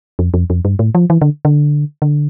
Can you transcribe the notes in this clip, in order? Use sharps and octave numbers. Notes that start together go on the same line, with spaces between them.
F2
F2
F2
G2
A2
F3
E3
D3
D3
D3